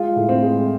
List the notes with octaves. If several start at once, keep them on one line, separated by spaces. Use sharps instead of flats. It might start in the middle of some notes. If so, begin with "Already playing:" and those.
Already playing: G#3 F4
A2
C4
G#3